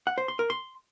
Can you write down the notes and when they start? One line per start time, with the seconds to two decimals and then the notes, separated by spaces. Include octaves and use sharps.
0.07 F#5
0.18 C5
0.28 C6
0.39 A#4
0.50 C6